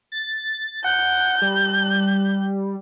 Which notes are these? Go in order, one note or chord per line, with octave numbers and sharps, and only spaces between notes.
A6
F#5 G6
G3